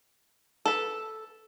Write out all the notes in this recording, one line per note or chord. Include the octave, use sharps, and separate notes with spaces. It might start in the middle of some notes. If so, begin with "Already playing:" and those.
A4 B4